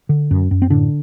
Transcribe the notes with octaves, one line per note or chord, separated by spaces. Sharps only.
D3
F#2
F#2
C4
A2 D3 D4